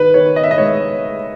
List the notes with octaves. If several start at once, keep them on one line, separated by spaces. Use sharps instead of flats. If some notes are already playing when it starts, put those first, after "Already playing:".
Already playing: D#3 B4
D#3 C#5
D#5
E5
D#5
G#3 C#5